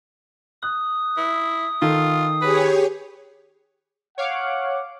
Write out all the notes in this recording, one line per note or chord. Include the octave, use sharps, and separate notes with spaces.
D#6 F#6
E4
D#3 F4 A4
G4 G#4 B4 C#5
C#5 F5 F#5 D6